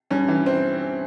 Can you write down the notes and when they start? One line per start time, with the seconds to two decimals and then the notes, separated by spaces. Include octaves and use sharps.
0.11 G2 C#4
0.28 E3
0.46 C4